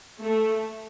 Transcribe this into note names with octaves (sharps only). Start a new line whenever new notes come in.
A3